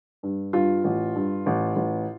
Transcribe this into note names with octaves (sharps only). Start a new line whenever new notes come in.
G2
G2 F4
A1
G2
A1
A1